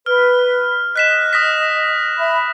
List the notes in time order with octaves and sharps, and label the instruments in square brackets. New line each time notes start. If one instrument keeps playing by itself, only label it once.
[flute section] B4 [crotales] F6
[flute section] D#5 [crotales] F#6 B6 E7
[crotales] D#6 A#6 B6
[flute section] E5 B5